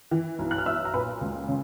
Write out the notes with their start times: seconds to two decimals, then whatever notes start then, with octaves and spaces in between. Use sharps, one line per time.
0.11 E3
0.39 B1
0.51 F#6
0.58 F6
0.66 B1 E5 E6
0.85 A#5
0.94 A#2 B4 B5
1.21 C#2
1.48 C#3